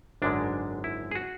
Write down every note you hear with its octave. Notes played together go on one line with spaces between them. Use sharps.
G#1 F#2 D3 G#3 D4
E4
G#4
F#4